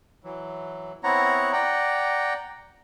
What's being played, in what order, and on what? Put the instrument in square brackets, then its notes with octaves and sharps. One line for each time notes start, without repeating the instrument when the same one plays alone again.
[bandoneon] E3 F#3
B3 C4 E4 C#5 F#5 A#5
D5 F#5 G5 A#5